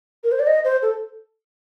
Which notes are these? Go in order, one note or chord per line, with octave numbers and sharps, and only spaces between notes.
A#4
C5
D5
D#5
C5
A4